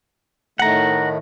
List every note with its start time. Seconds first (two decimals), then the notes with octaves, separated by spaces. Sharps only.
0.59 A2 D#3 A3 F#5 A#5